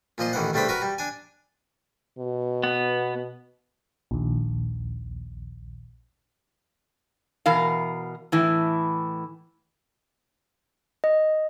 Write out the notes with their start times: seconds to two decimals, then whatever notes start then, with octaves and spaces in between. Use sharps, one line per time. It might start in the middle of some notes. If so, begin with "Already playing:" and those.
0.18 A#2 F3 D#5 C6
0.33 A1 D#3 E3 F#5
0.53 E2 G3 A3 D4 C5 B5
0.69 F#4 A#4 B4
0.82 G3
0.98 D4 G#5
2.19 B2
2.63 B3
4.11 A#1 D#2
7.46 B2 E3 A#4 F5
8.32 A2 E3
11.04 D#5